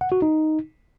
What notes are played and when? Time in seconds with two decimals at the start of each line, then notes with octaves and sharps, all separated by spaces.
0.01 F#5
0.12 F#4
0.22 D#4